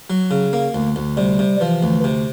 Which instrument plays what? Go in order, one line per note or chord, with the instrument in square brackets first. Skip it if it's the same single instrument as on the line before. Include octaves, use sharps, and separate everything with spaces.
[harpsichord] F#3
C#3
A#3
D2
D2
[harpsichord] C3 [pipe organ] G3
[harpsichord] C3
[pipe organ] E3 [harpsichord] F3
[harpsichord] D2
C3